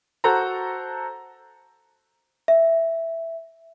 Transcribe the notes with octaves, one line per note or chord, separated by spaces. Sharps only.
F#4 A4 C5 A#5
E5